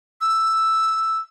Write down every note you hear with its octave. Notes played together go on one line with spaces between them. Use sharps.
E6